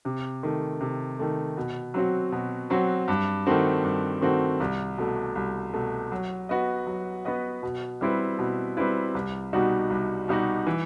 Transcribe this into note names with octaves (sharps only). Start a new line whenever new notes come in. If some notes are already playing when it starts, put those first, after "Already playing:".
C3
D#3 A3
C3
D#3 A3
B2
F#3 C4 F#4
B2
F#3 C4 F#4
G2
D#3 A3 C4 F#4
G2
D#3 A3 C4 F#4
C2
B2 A3
C2
B2 A3
F#3
B3 F#4 B4 D#5
F#3
B3 F#4 B4 D#5
B2
G3 C4 E4 B4
B2
G3 C4 E4 B4
C2
B2 G3 D#4 F#4
C2
B2 G3 D#4 F#4
E3